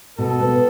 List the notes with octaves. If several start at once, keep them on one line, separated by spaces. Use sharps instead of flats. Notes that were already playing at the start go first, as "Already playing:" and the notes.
B2 A4
B3